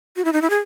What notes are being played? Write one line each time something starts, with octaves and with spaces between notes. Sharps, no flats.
F#4
E4
D#4
E4
G#4